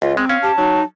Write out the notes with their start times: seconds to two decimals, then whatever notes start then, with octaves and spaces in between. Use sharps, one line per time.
0.02 C#2 F4
0.17 G#3 C4
0.29 C#4 F5
0.43 G4 A5
0.58 F#3 D#4